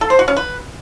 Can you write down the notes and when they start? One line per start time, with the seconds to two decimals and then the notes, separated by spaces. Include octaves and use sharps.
0.01 A4
0.10 C5
0.19 F#4
0.28 C#4
0.37 B4